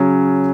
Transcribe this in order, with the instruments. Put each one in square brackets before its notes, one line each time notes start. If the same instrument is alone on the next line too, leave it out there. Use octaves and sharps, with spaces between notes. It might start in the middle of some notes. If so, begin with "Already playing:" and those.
Already playing: [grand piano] C#3 F#3 C#4